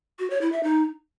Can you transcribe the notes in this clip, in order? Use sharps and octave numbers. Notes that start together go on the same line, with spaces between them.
F#4
C#5
E4
E5
D#4